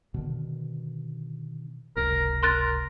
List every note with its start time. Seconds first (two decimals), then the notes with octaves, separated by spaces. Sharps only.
0.14 B2 D3 D#3
1.96 F#1 C#2 C3 A#4
2.43 A#4 C6 F#6 A6